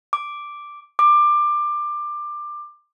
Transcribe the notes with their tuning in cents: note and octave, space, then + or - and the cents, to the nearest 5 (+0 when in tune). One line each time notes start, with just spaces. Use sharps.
D6 +0
D6 +20